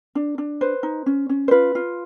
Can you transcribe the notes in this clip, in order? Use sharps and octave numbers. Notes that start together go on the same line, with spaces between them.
D4
D4
B4 C5
D#4
C#4
C#4
C5
F4 B4
F4